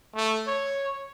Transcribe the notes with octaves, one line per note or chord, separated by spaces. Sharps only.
A3
C#5